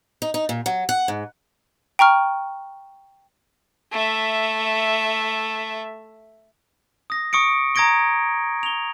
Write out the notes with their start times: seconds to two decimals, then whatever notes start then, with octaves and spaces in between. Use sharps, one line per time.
0.22 D#4
0.34 D#4
0.49 A#2
0.66 F#3
0.89 F#5
1.08 G#2
1.99 G5 A#5 C#6 F6
3.92 A3 E5
7.10 D#6 A#6
7.33 C#6 D#6 C#7 D7
7.75 A#5 D#6 G#6 A#6 D7 G7
8.63 F7 G7